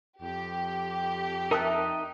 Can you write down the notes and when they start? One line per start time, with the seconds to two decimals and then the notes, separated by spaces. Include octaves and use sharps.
0.21 F2 G4
1.51 D#4 A#4 E5 A5 D#6 F#6